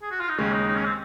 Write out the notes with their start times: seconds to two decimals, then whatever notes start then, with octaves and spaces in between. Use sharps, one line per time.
0.02 G#4
0.11 F#4
0.20 F4
0.29 D#4
0.38 D#2 C#3 G#3 C#4
0.53 D#4
0.67 D#4
0.76 C#4
0.85 C4